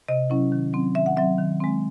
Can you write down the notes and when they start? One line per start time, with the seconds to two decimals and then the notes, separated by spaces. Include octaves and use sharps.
0.08 C3 D#5
0.30 F#3 C#4 E4
0.52 D#3
0.73 F#3 C4
0.95 D#3 E5
1.06 F#5
1.17 F#3 C4 E5
1.38 D#3
1.60 G#3 C4